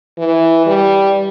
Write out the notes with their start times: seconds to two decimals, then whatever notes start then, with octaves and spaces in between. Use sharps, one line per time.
0.18 E3
0.67 G3